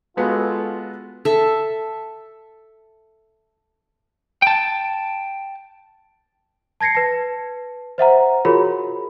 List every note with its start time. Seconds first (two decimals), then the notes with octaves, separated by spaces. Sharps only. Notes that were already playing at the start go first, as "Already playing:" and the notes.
0.17 G#3 B3 F4 F#4 A4
1.25 A4 E5
4.42 G5 A5
6.81 A5 G#6 A#6 C7 C#7
6.95 B4 A5
7.98 C5 E5 F#5 A#5
8.45 F4 F#4 G#4 A#4 C#5 B5